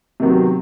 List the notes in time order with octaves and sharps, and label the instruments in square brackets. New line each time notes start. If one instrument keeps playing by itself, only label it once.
[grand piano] C3 D#3 F#3 B3